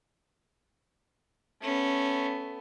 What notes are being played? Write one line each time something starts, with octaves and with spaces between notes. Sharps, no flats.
A3 B3 C#4